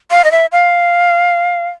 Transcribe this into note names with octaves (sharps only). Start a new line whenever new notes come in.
F5
D#5
E5
F5